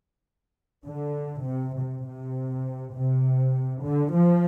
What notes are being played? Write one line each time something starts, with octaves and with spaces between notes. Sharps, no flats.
D3
C3
C3
C3
C3
D3
F3